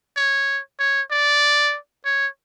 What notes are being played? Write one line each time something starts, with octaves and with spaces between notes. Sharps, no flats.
C#5
C#5
D5
C#5